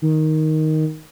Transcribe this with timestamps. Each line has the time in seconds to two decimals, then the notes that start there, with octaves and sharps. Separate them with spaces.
0.02 D#3